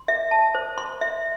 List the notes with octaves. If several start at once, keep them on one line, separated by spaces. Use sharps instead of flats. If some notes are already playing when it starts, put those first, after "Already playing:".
Already playing: C6
E5
A5
C5
C6
E5